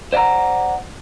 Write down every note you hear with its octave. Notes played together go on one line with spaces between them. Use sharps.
C5 D5 E5 F#5 A#5